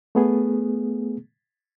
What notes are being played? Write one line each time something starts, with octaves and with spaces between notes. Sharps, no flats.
A3 B3 G#4